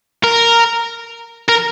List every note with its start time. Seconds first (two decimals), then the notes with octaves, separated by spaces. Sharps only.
0.24 A#4
1.49 A#4